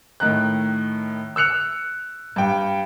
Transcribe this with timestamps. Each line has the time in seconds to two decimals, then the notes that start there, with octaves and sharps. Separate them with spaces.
0.20 A2 D#3 A#5 F#6
1.36 E6 F#6 C#7 F7
2.36 G2 G5